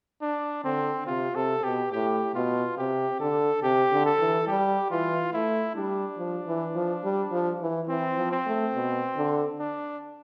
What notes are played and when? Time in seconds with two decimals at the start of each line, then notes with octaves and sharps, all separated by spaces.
0.22 D4
0.64 D3 C4
1.07 C3 F4
1.35 C3 A4
1.64 B2 G4
1.92 A2 G4
2.35 B2 F4
2.77 C3 G4
3.20 D3 A4
3.63 C3 G4
3.92 D3
4.06 A4
4.20 E3
4.47 G3 G4
4.90 E3 F4
5.33 A3 E4
5.75 G3 D4
6.18 F3
6.47 E3
6.76 F3
7.04 G3
7.32 F3
7.61 E3
7.89 E3 C4
8.17 F3
8.31 C4
8.46 A3
8.74 B2
9.16 D3
9.59 D4